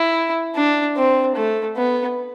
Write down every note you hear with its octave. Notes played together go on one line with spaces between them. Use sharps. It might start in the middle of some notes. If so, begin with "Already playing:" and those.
Already playing: E4
D4
C4
A3
B3